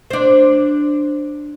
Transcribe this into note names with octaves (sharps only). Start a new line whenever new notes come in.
D4 C5